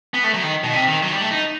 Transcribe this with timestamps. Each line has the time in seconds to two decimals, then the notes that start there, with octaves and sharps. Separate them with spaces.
0.14 B3
0.24 A3
0.34 F#3
0.44 D#3
0.64 B2
0.73 C3
0.88 D#3
1.03 F#3
1.12 G3
1.22 A3
1.31 D#4